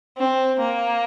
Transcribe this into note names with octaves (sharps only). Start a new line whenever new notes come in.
C4
A#3